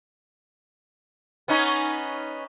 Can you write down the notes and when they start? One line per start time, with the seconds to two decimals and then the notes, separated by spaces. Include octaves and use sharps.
1.48 B3 C#4 D#4